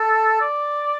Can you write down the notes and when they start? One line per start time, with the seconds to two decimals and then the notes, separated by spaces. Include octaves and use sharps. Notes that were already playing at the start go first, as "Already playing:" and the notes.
Already playing: A4
0.41 D5